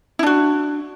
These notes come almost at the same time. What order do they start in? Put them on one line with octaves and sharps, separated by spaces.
E4 D4 F#4